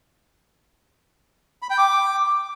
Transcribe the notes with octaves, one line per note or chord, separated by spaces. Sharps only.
B5
G5
D6